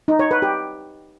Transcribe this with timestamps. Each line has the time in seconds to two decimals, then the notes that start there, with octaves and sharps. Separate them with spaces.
0.08 D#4
0.19 C#5
0.31 B4
0.42 G4